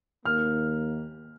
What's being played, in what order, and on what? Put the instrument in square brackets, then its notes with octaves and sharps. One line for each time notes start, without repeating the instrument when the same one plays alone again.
[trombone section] D#2 D#3 A#3 [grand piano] F6